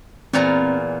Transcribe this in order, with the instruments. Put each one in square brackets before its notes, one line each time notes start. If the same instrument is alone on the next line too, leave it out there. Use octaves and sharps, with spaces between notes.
[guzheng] E2 A#2 A#5 [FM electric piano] C4